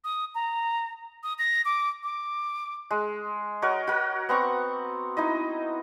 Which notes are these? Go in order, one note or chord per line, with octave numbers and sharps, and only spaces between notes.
D#6
A#5
D#6
A#6
D6
D6
G#3
F#4 A#4 C#5 D#5
F#4 A#4
B3 C4 A#5 C#6
D#4 E4 D#5